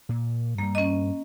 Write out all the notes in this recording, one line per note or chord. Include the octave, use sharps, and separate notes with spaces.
A#2
G2 G3 A#3
C#4 D#5